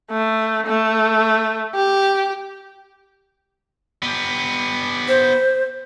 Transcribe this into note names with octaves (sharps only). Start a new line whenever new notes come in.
A3
A3
G4
B3 G4
C5